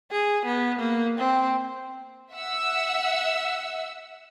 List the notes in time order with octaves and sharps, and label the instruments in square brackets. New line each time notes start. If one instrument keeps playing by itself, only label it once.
[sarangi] G#4
B3
A#3
C4
[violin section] E5 F#5 E6